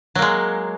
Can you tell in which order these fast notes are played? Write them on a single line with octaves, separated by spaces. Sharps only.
F#3 A#3 G#3